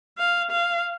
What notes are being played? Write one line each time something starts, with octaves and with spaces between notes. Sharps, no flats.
F5
F5